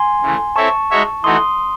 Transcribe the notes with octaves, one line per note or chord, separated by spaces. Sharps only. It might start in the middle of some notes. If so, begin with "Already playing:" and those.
Already playing: G#5 C6
C#3 E3 A3
C4 E4 A4 C#5 E5 A5 C#6
G#3 D#4 F#4 C#5 E5
E3 A3 D#4 F#4 C6 D#6